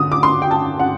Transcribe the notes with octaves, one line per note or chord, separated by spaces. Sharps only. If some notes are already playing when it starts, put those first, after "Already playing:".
Already playing: D3 D#6
D6
C6
G5
A5
F#5